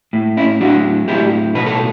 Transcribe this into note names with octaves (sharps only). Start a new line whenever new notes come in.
A2
C#4 E4
F#3 D4 F#4
A2 E4 G4
B2 B4
A4